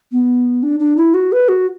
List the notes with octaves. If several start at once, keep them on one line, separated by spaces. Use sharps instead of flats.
B3
D4
D4
E4
F#4
B4
F#4